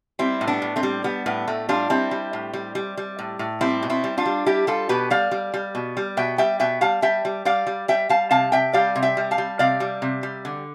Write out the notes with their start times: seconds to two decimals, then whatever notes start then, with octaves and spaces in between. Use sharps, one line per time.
0.19 G3 C4 E4
0.41 A2
0.48 B3 D4
0.62 A2
0.76 A3 C4
0.83 G3
1.04 G3 B3
1.26 A2 B3
1.47 A2 A3
1.69 G3 D4 F4
1.90 G3 C4 E4
2.11 G3
2.33 A2
2.53 G3
2.75 G3
2.97 G3
3.19 A2
3.39 A2
3.61 G3 C4 E4
3.83 B2
3.90 C4 E4
4.04 G3
4.17 D4 F4
4.26 G3
4.46 G3 E4 G4
4.67 G3 F4 A4
4.89 B2 G4 B4
5.10 G3 D5 F5
5.31 G3
5.54 G3
5.75 B2
5.97 G3
6.17 B2 E5 G5
6.38 G3 E5 G5
6.60 B2 E5 G5
6.81 G3 F5 A5
7.02 G3 E5 G5
7.25 G3
7.45 G3 D5 F5
7.67 G3
7.88 G3 E5 G5
8.09 G3 F5 A5
8.31 C3 F5 A5
8.52 C3 E5 G5
8.73 G3 D5 F5
8.96 C3
9.03 E5 G5
9.17 G3
9.31 F5 A5
9.38 G3
9.59 C3 D5 F5
9.80 G3
10.02 C3
10.23 G3
10.45 D3